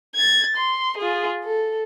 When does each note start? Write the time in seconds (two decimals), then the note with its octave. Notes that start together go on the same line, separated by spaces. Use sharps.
0.16 G#6 A6
0.56 C6
0.97 F4 G#4
1.44 A4